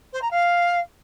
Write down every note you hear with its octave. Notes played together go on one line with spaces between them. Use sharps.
C5
A#5
F5